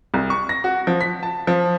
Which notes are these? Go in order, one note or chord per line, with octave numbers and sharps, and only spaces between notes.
C2
C#6
A#6
F#4
F3
B6
A5
F3